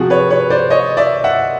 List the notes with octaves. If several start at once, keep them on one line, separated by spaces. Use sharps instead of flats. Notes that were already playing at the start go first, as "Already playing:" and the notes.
Already playing: C3 F3 F#4 G#4
B4 C#5
B4 C#5
C5 D5
C#5 D#5
D5 E5
E5 F#5